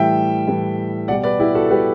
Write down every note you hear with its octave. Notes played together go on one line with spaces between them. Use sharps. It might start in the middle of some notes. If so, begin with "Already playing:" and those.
Already playing: A2 E3 G3 E5 G5
A2 E3 G3
B2 G3 D5 F#5
B4 D5
E4 G4
F#4 A4
A4
B2 G3 G4 B4